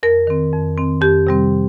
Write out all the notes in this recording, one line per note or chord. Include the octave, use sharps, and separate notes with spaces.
F2 A#4
D#3 C4
F2
D#3 C4
F2 G4
C3 G3 C4